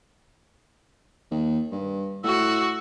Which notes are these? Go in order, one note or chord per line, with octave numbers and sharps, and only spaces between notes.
D#2
G2
A2 F#4 E6